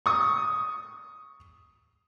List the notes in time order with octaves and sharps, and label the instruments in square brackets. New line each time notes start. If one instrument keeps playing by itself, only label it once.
[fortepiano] C#6 D#6